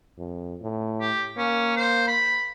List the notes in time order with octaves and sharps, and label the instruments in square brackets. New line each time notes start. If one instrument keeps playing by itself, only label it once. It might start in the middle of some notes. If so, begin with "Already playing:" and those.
[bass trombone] F2
A2
[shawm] G4
[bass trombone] A#3 [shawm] C#4
[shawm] C5
B5